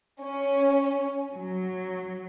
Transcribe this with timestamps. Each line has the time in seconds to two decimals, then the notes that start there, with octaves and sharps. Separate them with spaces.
0.23 C#4
1.35 F#3